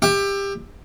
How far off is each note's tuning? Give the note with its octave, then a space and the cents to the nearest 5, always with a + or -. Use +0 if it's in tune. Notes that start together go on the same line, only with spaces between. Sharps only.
G4 +20 E5 +0